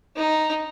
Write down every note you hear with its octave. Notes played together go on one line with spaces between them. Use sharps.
D#4